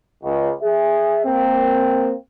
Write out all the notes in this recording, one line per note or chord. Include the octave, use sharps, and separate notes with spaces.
C#2
G#4 E5
A#3 C4